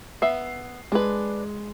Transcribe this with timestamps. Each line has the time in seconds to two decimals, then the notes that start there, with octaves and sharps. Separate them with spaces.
0.22 B3 E5 C7
0.92 G#3 D4 B4